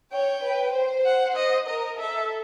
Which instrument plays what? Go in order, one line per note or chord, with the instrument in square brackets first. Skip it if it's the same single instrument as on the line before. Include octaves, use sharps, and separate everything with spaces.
[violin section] C#5 [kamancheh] G5
[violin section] B4
C5
[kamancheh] F#5
D#5
[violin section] A#4 [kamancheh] D#5
[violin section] A4 [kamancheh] E5